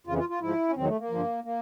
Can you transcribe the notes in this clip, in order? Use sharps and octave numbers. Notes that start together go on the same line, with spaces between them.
F2 C#3 E3 F4
F4
F4
G#2 F3 E4
C#4
E2 C3 D#3 F#3 C4
A3
A#3
G2 D3 F3
A#3